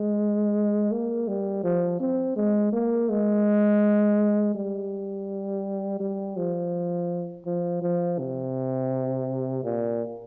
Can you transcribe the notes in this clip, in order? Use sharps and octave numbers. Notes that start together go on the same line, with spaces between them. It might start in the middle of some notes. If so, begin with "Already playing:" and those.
Already playing: G#3
A#3
G3
F3
C4
G#3
A#3
G#3
G3
G3
F3
F3
F3
C3
A#2